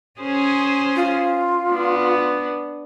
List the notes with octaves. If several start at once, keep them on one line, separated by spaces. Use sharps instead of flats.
C#4 G#4 C5
F4
B3 D4